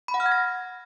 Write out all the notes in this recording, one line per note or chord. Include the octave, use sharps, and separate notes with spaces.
B5
F#5
F6
G#6
A#6